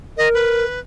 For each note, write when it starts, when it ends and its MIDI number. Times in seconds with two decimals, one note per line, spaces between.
0.18 0.65 70
0.18 0.29 75
0.34 0.80 71